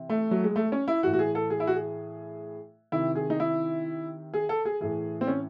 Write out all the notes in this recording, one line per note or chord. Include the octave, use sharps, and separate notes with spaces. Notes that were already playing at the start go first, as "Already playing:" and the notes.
Already playing: C3 E3
A3
F#3
G#3
A3
C#4
E4
A2 E3 F#4
F#4
G#4
A4
G#4
E4
F#4
G#4
C3 D#3 E4
G#4
D#4
E4
G#4
A4
G#4
A2 E3 G#4
C4
C#4